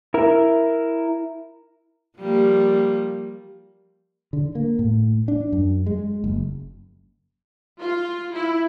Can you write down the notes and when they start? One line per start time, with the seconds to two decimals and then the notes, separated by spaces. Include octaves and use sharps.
0.14 E4 A#4
2.18 F3 G3 A#3
4.33 D3
4.55 A#3
4.79 A2
5.28 D4
5.52 F#2
5.86 G#3
6.24 F#1
7.79 F4
8.33 E4